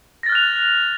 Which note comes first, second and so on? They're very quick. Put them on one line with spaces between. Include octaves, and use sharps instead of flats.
A#6 A6 F6 F#6 F7